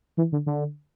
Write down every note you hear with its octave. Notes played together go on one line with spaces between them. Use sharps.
E3
D3
D3